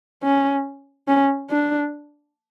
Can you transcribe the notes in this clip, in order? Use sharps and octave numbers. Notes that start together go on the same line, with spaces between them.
C#4
C#4
D4